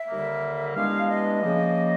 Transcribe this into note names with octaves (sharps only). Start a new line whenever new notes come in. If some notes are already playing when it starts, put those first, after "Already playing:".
Already playing: E5
D#2 D3 G3 A#3
G2 E3 G#3 B3 D4 F5
D#5
C#3 F3 A#3